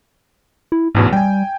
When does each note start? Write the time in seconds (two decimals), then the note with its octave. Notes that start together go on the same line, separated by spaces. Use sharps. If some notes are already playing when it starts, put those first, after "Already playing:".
0.72 E4
0.95 A1 E2 G#2 B2
1.13 G3 G5 G#5